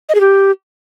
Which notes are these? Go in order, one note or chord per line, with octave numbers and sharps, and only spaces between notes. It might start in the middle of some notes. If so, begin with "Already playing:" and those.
D#5
G#4
G4